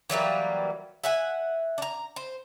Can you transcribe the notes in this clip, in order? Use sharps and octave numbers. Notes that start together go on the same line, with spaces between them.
E3 F#3 G3 A#3
E5 F#5 G#5
D4 A#5
C5